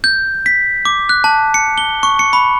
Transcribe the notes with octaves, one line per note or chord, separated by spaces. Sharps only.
G6
B6
D6
F#6
A5
C#7
G7
C#6
C#7
B5